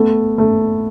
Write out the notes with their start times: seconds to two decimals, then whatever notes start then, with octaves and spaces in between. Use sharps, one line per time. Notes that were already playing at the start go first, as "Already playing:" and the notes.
Already playing: A3 B3
0.38 A3